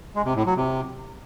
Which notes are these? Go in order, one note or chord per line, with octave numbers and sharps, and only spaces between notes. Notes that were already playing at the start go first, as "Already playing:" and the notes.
G#3
C3
A2
F#3
C3